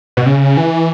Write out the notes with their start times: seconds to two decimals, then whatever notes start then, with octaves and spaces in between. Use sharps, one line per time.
0.17 B2
0.26 C#3
0.57 E3